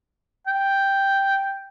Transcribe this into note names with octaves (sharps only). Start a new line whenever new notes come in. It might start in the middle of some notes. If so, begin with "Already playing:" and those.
G5